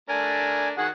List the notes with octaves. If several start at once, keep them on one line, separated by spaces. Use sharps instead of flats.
A3 D4 A#4 G#5
D#3 F#4 G#4 F#5